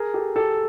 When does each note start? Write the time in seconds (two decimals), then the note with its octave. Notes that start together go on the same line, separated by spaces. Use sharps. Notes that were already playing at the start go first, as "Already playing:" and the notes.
Already playing: G#4 A#4
0.14 G4 A4
0.36 G4 A4